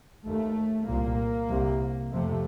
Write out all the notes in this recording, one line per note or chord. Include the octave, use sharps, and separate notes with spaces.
D#2 A3
C2 A#2 A#3
C2 C3
F2 C3 A3